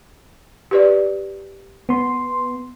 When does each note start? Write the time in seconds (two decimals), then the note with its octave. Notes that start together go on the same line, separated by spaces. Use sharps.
0.71 G4 B4 D5
1.89 B3 C6